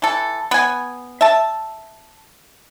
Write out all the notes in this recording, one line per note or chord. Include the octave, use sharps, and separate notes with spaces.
E3 A4
B3 G#5
E5 A5